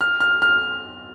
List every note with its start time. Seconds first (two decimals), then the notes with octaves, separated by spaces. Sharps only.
0.01 F6
0.20 F6
0.42 F6